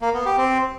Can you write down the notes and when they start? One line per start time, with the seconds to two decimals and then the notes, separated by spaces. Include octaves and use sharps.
0.02 A#3
0.14 B3
0.26 G4
0.38 C4